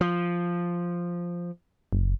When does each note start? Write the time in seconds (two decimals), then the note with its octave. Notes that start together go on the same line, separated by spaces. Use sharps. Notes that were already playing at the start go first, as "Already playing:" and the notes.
0.01 F3
1.93 F#1